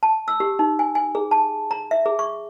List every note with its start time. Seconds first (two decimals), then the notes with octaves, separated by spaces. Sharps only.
0.03 A5
0.28 E6
0.40 G4
0.59 D#4
0.79 G#5
0.95 G#5
1.15 G#4
1.31 A5
1.71 A#5
1.91 E5
2.06 G#4
2.19 C#6